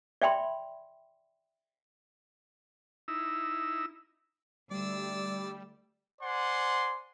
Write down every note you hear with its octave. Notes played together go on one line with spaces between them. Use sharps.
D5 E5 G5 B5 C6
D#4 E4 E6
D2 G3 D5 E6
C5 D5 F#5 G#5 C6